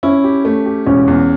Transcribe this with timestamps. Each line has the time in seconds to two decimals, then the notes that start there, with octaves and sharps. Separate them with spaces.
0.03 C#4 E4
0.24 G4
0.45 A3
0.66 G4
0.86 E1 C#4
1.08 E2